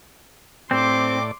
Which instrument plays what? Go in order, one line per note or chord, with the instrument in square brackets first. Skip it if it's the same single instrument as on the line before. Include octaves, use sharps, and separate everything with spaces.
[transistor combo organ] A2 D5 [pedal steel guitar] C4 [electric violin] C6 D6